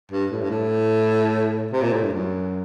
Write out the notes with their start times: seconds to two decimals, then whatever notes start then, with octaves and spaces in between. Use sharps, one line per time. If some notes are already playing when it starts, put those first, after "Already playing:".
0.11 G2
0.32 A2
0.41 G2
0.50 A2
1.72 C3
1.82 A#2
1.93 A2
2.03 G2
2.13 F#2